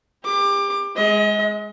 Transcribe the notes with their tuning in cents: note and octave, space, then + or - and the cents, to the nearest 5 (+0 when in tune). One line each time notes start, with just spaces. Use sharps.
G4 +40 D6 +20
G#3 +0 D#5 +35